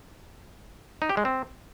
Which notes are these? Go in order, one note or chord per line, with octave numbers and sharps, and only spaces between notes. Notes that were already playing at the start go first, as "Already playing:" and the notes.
D#4
G4
G#3
C4